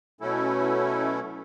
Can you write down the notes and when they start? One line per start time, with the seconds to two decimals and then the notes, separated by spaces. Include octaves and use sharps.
0.21 B2 F#3 A3 C#4 E4 A4